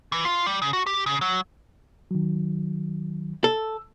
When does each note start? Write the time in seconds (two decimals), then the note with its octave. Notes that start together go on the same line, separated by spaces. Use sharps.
0.12 E3
0.25 F4
0.46 G3
0.62 C#3
0.73 F#4
0.86 G4
1.06 C#3
1.21 F#3
2.11 D#3 F#3
3.44 A4 E6